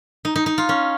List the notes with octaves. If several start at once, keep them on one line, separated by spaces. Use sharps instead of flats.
D#4
D#4
D#4
F4
C#4